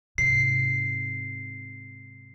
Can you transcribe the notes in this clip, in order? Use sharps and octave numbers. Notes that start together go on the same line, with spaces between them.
G#2 C3 C7